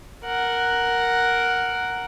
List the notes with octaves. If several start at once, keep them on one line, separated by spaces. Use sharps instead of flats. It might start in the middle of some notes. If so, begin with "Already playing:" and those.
A#4 F#5